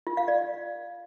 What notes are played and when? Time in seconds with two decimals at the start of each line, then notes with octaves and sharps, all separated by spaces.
0.07 F4
0.17 F5
0.28 D5